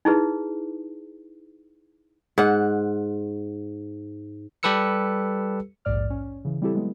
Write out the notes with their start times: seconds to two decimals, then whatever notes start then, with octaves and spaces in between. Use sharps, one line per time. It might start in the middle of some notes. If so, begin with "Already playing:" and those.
0.05 D#4 E4 G#4 B4
2.38 G#2 F#5
4.63 G3 G4 A4 B4 E6 C#7
5.85 A#1 D#2 G#2 D5 F6
6.10 C#4
6.45 C#3 E3
6.62 G3 C4 E4 G4 A4
6.74 F#3 G#3 B3